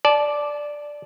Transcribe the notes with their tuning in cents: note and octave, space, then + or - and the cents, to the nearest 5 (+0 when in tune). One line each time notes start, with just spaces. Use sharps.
D5 +0 A5 -20